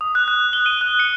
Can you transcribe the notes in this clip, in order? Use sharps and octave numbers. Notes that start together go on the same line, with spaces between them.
D#6
F#6
F#6
G7
D#7
F#6
C#7